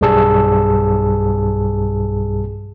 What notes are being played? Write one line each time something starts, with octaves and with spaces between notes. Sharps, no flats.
B1 G2 G3 G#4 A5 E6